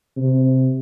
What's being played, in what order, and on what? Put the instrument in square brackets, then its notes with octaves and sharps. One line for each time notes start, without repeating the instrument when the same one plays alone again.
[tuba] C3